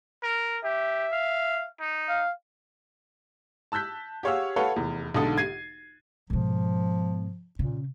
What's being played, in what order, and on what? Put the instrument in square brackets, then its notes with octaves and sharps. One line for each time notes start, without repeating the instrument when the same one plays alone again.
[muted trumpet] A#4
[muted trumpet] G4 [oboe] E5
[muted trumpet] F5
D#4
[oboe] F5
[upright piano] A5 E6 F#6 G6 B6
G4 G#4 C#5 F5 F#5 E6
A4 B4 C#5 F5 F#5
F1 E2
B1 G#2 D3 A4 D#6 A6
G#6 C7 D#7
[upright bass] G#2 B2 [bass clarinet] F3
[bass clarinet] A#2 [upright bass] C#3